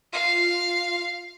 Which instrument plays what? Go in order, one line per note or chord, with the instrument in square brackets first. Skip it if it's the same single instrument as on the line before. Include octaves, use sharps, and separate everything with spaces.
[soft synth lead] F4 [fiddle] F5